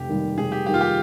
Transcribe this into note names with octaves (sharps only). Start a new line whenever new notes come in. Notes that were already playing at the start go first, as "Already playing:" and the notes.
Already playing: F1 G4
D#2 D#3 G3
F1 G#4
G4
D#2 D#3 G3 G4
F4
G4